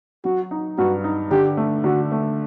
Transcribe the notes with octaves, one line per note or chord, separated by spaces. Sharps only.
F#3 F#4
D#4
G2 F#4
D#4
D3 G4
A3
D3 F#4
A3